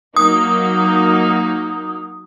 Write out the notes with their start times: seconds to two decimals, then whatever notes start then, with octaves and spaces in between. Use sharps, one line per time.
0.16 F#3 A#3 D#4 D#6